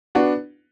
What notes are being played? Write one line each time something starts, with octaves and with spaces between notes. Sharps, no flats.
B3 D4 F#4